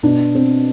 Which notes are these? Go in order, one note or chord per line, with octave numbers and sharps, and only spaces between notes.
B2 D4
C4